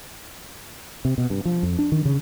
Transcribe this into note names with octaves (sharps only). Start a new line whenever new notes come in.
C3
B2
G2
F3
F2
D4
D#3
C#3